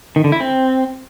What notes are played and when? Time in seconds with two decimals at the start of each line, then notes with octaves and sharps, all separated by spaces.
0.16 D#3
0.24 D3
0.32 E4
0.40 C4